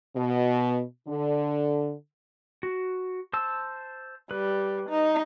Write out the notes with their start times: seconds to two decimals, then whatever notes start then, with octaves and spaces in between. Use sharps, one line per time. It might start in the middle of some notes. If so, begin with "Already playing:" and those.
0.16 B2
1.09 D3
2.63 F#4
3.33 C5 A5 E6
4.31 G3 B4
4.89 D#4